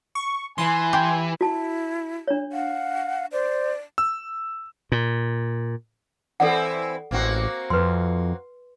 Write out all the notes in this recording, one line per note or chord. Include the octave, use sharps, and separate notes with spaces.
C#6
E3 G#5 C6
G4
E4 F#4 A5
D4 C#5
F5 F#5
C5 D5
E6
A#2
E3 C4 E4 A4 D5 F#5
A1 A#3 C4 F#4
F2 B4 C6